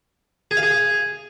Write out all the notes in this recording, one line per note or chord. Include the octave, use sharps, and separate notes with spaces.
G#4
F5
G#4